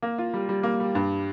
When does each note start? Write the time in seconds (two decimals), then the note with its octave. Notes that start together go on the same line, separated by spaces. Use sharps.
0.03 A#3
0.18 F4
0.34 G3
0.49 G3
0.63 A#3
0.80 G3
0.95 G2